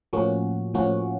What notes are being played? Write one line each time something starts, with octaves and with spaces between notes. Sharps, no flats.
A2 F3 A#3 C#4 F#4
A2 F3 A#3 C#4 F#4